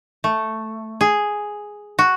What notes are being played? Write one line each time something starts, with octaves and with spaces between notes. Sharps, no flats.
A3
G#4
F#4